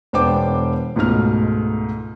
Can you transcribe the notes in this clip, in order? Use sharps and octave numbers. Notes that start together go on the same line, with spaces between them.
E1 B3 D4 C5 G5 D6
C#2 G#2 B2 A3 F6